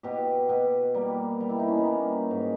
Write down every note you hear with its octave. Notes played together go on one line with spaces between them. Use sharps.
B2 G4
B2
G3 A#3
G3
E4
D#4
C#4
B3
G3 A#3
G#2